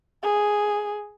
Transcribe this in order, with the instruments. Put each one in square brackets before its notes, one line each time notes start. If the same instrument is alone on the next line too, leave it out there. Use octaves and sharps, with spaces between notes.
[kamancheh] G#4